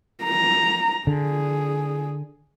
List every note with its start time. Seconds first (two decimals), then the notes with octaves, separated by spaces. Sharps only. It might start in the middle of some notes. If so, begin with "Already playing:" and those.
0.24 A#5
1.07 D3 G#4